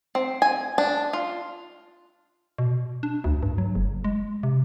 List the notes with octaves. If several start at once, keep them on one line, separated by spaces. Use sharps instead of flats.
C4
G#5
D4
F4
B2
D4
D2
G2
F#3
F#1
G#3
C3